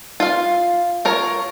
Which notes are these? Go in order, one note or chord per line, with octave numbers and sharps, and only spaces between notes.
F4 F5
F4 A#4 C#5